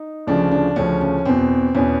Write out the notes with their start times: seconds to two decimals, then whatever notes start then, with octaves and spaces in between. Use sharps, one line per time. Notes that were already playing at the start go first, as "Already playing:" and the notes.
Already playing: D#4
0.27 D2 C#3 F3 D4
0.51 D4
0.76 D2 C#3 F3 C#4
1.01 C#4
1.25 E2 B2 C4
1.75 E2 B2 C#4